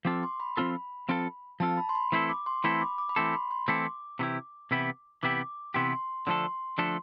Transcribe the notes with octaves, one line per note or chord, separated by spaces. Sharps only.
F3 C4 F4 A4 D6
C6
B5
F3 C4 F4 A4
F3 C4 F4 A4
F3 C4 F4 A4 A5
B5
C6
B5
E3 A3 C4 E4 A4
D6
C6
E3 A3 C4 E4 A4 B5
D6
D6
B5
E3 A3 C4 E4 A4 C6
B5
C6
E3 A3 C4 E4 A4 D6
C3 E3 B3 E4 G4
C3 E3 B3 E4 G4
C3 E3 B3 E4 G4 D6
C3 E3 B3 E4 G4 C6
D3 F3 A3 D4 A4 C6
D3 F3 A3 D4 A4